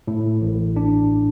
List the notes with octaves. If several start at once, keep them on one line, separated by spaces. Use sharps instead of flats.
A2
A1
D4